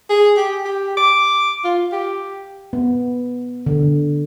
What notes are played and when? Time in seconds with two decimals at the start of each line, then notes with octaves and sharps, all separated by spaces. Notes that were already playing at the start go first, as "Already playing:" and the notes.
0.10 G#4
0.37 G4
0.65 G4
0.97 D6
1.65 F4
1.92 G4
2.73 B3
3.66 D3